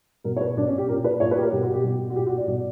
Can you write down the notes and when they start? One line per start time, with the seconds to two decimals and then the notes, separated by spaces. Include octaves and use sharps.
0.24 B2 A#4
0.36 C#5
0.41 B4
0.57 B2 D4
0.68 C#4
0.78 G4
0.89 A#2 A#4
1.04 B4
1.20 A#2 C#5
1.31 B4
1.37 G4
1.41 A#4
1.52 B2 G4
1.63 F#4
1.73 G4
1.84 B2
2.10 F#4
2.16 A#2 G4
2.27 F#4
2.37 D5
2.48 B2 D5